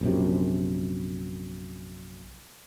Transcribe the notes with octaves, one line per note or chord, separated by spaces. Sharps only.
A#1 F#2 C3